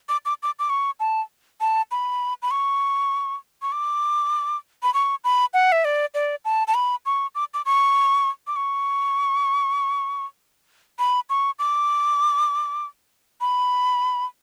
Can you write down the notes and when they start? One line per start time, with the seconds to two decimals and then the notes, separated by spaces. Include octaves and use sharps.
0.09 D6
0.26 D6
0.43 D6
0.59 D6
0.70 C#6
1.00 A5
1.61 A5
1.91 B5
2.42 B5
2.51 C#6
3.62 C#6
3.72 D6
4.83 B5
4.94 C#6
5.24 B5
5.54 F#5
5.72 E5
5.85 D5
6.14 D5
6.45 A5
6.68 A5
6.74 B5
7.06 C#6
7.35 D6
7.54 D6
7.66 C#6
8.47 D6
8.56 C#6
10.99 B5
11.30 C#6
11.59 D6
13.41 B5